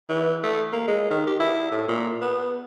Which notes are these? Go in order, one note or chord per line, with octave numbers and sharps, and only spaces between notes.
E3
A3
A#3
G#3
D#3
G4
E4
A2
A#2
B3